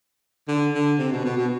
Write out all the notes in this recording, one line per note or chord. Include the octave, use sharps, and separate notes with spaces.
D3
D3
C3
B2
B2
B2